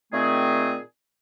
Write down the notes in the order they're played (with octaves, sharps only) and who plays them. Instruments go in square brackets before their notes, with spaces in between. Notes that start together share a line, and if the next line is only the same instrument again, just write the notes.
[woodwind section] A#2 D#3 A3 C4 G#4